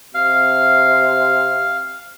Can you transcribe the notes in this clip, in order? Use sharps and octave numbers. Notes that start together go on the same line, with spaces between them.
C3 F5